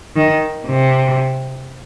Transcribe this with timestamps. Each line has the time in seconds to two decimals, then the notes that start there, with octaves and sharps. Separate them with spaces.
0.16 D#3
0.66 C3